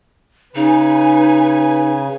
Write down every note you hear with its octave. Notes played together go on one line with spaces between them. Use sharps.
C#3 D#4 B4 G#5